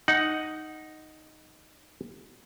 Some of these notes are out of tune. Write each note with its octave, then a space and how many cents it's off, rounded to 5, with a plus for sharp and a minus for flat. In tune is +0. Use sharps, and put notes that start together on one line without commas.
D#4 +0 F#5 +5